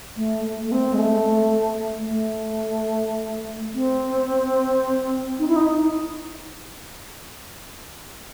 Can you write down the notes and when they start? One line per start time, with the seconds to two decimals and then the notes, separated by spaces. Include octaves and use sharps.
0.16 A3
0.44 A3
0.66 A3
0.72 C4
0.94 G#3
0.99 A3
2.09 A3
3.74 C4
5.39 D#4
5.48 E4
5.56 D#4